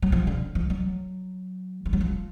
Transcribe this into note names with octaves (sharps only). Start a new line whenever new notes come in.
F#3
F3
D3
F3
F#3
F3
F#3
F3